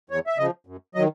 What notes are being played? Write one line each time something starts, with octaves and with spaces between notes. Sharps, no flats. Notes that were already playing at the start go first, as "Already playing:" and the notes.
E2 C#5
E5
C#3 F3 D#5
F#2
D#3 F#3 D#5